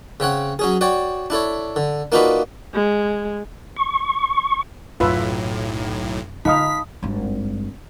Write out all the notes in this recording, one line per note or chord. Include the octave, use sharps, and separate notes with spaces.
C#3 C4 C#5 F#5
F#3 C#4 G#4
F#4 C#5 D5 G5
D4 E4 A4 C#5
D3
A#3 D4 D#4 F4 F#4 B4
G#3
C#6
B1 F#2 A2 C3 F4 B4 E5
D3 D#4 F4 F5 A5 B5 D#6 B6
G#1 G2